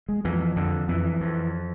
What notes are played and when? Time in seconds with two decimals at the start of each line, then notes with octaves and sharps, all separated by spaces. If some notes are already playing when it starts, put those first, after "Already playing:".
0.09 G#3
0.25 F2 E3
0.56 F2 D3
0.88 F2 E3
1.20 F2